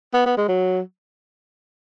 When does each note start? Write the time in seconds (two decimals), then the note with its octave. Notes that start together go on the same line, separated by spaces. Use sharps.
0.14 B3
0.26 B3
0.38 G#3
0.48 F#3